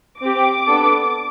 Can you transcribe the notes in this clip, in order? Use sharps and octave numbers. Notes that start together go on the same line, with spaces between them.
C4 G4 D6
B3 D4 A4